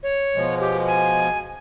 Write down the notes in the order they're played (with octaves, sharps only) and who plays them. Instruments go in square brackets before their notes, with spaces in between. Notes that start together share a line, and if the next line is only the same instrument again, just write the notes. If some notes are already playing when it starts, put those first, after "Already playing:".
[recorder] C#5
[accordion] B2 F3 G#3
[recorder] G4
G#5